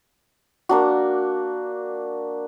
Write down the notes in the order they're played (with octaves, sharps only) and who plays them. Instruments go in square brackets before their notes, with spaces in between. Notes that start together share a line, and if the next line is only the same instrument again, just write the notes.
[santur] A#3 D4 F#4